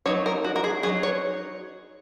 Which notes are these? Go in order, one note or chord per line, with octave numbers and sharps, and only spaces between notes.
F#3 D#4 C#5
A#4
F#4
A#4
G#4
F#3 D#4 G#4
C#5